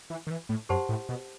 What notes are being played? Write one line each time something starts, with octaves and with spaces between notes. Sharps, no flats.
E3
D#3
E3
A2
F#2 G4 C5 F#5 A5 C6
A2
B2